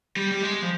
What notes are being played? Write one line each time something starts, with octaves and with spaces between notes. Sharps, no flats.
G3
G3
G#3
F3